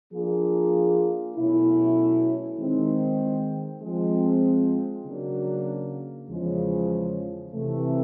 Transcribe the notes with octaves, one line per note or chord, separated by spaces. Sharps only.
F3 A#3 D4 F4 G#4
B2 F#3 A3 C#4 E4
D#3 G#3 C4
F3 G#3 C4
C#3 F#3 A#3 D4 F#4
E2 C#3 F3 G#3
C3 E3 A3